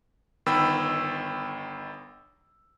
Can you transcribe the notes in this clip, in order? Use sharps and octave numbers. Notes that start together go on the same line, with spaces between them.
G1 D#3 B3 G5 B5 E6